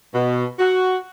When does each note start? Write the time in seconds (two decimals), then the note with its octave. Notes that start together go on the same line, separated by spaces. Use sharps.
0.14 B2
0.59 F#4